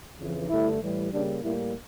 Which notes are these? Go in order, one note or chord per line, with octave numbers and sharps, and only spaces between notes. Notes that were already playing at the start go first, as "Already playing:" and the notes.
F2 C#3 E3
G2 D3 A3 E4
A2 E3 G3
C#3 G3 A#3 D4
A2 G3 A#3 E4